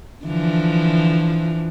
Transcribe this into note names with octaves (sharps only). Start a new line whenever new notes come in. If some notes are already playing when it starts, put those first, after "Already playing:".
D3 E3 F3